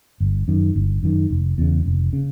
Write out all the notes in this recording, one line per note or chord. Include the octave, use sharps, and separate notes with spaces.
G1
F#2 D#3
G1
F#2 D#3
F1
E2 C#3
F1
C#3